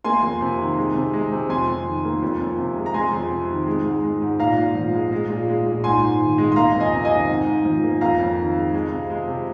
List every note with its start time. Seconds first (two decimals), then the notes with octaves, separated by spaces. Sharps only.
0.04 A#3 G#5 C6
0.23 F2
0.41 C3
0.59 D#3
0.77 G#3
0.95 C3
1.13 G#3
1.32 C3
1.49 F2 G#5 C6
1.68 F2
1.86 D#3
2.05 A#3
2.23 F2
2.40 F2
2.58 C3
2.77 G#3
2.86 A#5
2.94 G#3 G#5 C6
3.13 F2
3.31 C3
3.49 D#3
3.67 G#3
3.85 G#2
4.03 G#3
4.22 G#2
4.39 A#2 F5 A#5
4.57 A#2
4.75 F3
4.93 G#3
5.12 G#3
5.30 A#2
5.48 G#3
5.66 A#2
5.84 G#2 G#5 C6
6.02 G#2
6.20 D#3
6.38 G#3
6.52 C6
6.56 A#3 F5 A#5
6.75 F2
6.80 D#5 G#5
6.93 C3
7.05 D#5 G#5
7.11 D#3
7.29 G#2
7.47 G#2
7.65 F3
7.83 A#3
8.01 F2 F5 A#5
8.20 F2
8.38 D#3
8.56 G#3
8.74 G#3
8.92 C3
9.10 G#3
9.28 C3